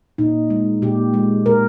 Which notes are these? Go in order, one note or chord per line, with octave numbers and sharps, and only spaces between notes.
A#2 D#4
G#3
A#2 G4
G#3
A#2 A#4